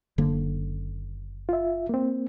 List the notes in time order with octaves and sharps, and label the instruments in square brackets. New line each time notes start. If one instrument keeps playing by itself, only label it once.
[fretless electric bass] F#1 D3 A#3
[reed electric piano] F4 E5
A#3 C4